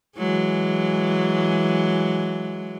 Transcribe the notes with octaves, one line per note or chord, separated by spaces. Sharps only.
E3 F#3 G#3